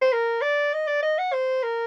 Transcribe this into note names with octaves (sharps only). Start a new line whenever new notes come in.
C5
A#4
D5
D#5
D5
D#5
F#5
C5
A#4